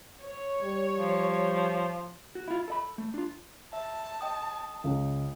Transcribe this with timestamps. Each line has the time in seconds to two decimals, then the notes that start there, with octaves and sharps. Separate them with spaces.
0.22 C#5
0.62 G3
0.98 F3
2.35 F#4
2.48 E4 F4
2.68 A4 D#5 B5
2.98 A3
3.14 D4 F4
3.73 E5 A5
4.21 D#5 G5 D#6
4.84 C#2